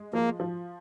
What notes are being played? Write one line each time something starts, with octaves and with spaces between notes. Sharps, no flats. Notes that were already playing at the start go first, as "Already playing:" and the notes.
Already playing: G#3
F3 A#3
F3